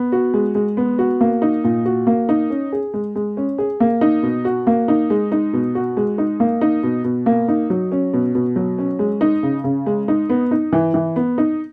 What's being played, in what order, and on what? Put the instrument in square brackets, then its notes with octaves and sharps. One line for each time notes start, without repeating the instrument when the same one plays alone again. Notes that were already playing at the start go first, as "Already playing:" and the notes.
Already playing: [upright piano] B3
F#4
G#3
G#3
B3
F#4
A#3
D#4
A#2
F#4
A#3
D#4
C#4
G#4
G#3
G#3
C#4
G#4
A#3
D#4
B2
F#4
A#3
D#4
G#3
D#4
B2
F#4
G#3
D#4
A#3
D#4
B2
B2
A#3
D#4
F#3
C#4
B2
B2
F#3
C#4
G#3
D#4
C#3
C#3
G#3
D#4
B3
D#4
E3
E3
B3
D#4